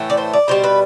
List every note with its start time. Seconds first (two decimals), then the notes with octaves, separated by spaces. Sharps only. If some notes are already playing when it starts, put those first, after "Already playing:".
Already playing: A2 E3 A3
0.10 D5
0.17 C5
0.33 D5
0.48 B2 G3 C5
0.64 B4